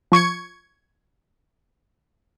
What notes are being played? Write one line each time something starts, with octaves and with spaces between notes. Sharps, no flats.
F3 C#6 G#6 C#7